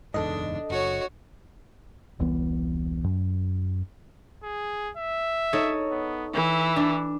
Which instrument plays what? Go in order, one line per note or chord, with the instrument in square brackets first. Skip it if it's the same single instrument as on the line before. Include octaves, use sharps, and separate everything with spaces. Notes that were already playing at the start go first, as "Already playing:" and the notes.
[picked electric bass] F#1 E2 G#2 [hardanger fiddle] D4 [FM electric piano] A4 D#5
[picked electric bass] F#1 [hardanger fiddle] F#4 C#5
[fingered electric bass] E1 C2 E3 B3
F#2
[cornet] G#4
E5
[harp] D#4 A4 C#5
[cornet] B3
[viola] E3 [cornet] E5
[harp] D4